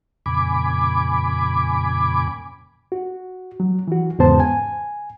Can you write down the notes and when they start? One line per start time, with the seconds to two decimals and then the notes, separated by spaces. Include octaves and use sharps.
0.26 F2 A#2 C#3 G#5 B5 D6
2.92 F#4
3.60 F#3
3.88 E3 F#4
4.19 E2 G#2 C#3 B3 C5 A5
4.40 G#5